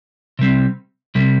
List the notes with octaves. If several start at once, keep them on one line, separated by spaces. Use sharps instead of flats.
C3 G3 C4
C3 G3 C4